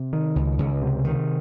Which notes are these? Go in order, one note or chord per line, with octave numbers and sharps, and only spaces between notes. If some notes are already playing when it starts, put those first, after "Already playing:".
Already playing: C3
D#3
C#2
C#2
C3
D#3